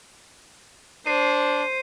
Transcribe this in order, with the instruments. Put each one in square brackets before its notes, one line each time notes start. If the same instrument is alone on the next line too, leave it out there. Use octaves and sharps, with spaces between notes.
[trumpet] D4 [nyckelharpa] C5 [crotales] C7 D#7